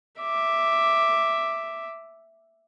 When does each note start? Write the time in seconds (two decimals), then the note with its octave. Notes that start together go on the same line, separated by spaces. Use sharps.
0.21 E5 D6